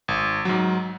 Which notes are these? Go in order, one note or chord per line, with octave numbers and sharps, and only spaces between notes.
G#1
G#2 F#3